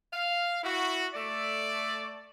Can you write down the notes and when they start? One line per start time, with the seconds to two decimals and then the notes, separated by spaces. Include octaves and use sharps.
0.13 F5
0.63 E4 F#4
1.14 A3 D5